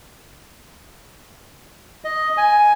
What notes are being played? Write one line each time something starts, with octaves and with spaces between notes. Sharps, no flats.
D#5
G#5